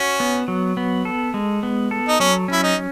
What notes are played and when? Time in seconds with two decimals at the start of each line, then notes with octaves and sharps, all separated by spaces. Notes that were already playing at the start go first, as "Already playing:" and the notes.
Already playing: C#4 F#4
0.20 B3
0.48 F#3
0.77 B3
1.05 A4
1.34 G#3
1.63 B3
1.91 A4
2.08 D#4
2.20 F#3 C#4
2.48 C#4 E4
2.63 D#4